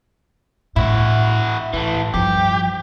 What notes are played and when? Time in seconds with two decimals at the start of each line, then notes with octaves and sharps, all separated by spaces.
0.76 A2 E4 F#4
1.73 A2 E3 A3
2.14 G2 F3 G4